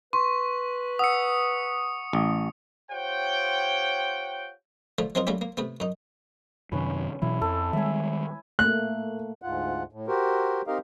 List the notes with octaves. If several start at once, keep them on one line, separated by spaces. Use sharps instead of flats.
B4 C6 C#6
F#5 D#6 E6 C#7
A1
F4 G4 C5 C#5 F#5 G5
D3 F3 A3
F3 F#3 C4 D#4 F4 A#4
F#3 G3 A3 A#3 C#4 G4
A#3
C3 A3 B3
F#2 D#4
F#2 C3 D#3 C#4 B4
B2 E3 F#3 E4
F2 A4
D#3 G3 G#3 E5 G#5
A3 A#3 F#6
D2 G#2 F4 F#5
A2
F#4 G4 A#4 C5
C4 D#4 G4 A#4 D#5 F5